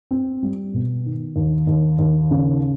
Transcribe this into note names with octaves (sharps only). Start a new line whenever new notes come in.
C4
G3
B2
D#3
D#2
D#2
D#2
C#3